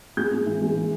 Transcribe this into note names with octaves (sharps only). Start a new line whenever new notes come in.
G#3 G6
G#3
E3
G#3
E3